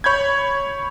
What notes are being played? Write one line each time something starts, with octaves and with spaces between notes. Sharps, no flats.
C#5 B5 G6 G#6